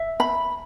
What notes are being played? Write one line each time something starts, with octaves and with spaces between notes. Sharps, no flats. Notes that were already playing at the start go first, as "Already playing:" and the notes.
Already playing: E5
B5